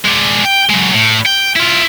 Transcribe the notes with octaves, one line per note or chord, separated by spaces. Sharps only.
G#3 D4
G5
F#3 G#3
A2
G5
E4 F4